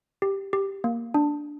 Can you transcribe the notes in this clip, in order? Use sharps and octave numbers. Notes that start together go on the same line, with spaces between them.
G4
G4
A#3
D4